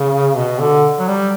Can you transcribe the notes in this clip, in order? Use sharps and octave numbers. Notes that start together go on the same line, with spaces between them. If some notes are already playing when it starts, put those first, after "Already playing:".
Already playing: C#3
B2
D3
F#3
G3